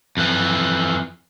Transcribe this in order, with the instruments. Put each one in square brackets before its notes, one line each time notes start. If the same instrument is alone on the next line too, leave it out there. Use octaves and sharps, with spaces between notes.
[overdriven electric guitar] F2 E3